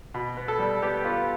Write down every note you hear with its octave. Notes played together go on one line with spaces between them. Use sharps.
B2
B3
A4
G3
B3 G4
B3 F4